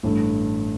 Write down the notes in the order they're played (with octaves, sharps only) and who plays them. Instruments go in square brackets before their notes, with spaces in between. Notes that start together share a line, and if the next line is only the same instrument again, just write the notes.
[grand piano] A1 G2 D3 A3